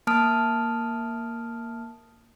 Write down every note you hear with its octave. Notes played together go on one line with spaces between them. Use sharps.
A#3 A5 D#6 F6 D7